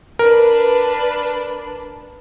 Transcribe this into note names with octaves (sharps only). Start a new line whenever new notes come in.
D4 A#4 B4